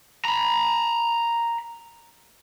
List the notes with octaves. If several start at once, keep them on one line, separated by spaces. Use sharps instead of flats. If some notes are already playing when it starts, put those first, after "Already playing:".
A#5 B5